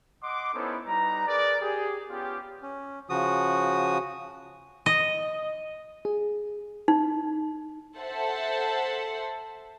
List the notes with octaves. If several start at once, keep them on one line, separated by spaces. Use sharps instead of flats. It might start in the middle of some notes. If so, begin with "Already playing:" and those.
D#5 F#5 C6 D6
B3 C#4 D#4 E4 A4 C5
G3 D#4 B4 A#5
G#4 A#4 B4 D5
G4 G#4
B3 C#4 F4 G4
C#4
C#3 F3 F#4 D#6
D#5
G#4
D#4
A4 C5 E5 F#5 A5